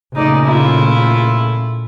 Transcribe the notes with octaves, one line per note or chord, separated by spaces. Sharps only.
A#2 C#3 A3 D#4 D5
E4 F4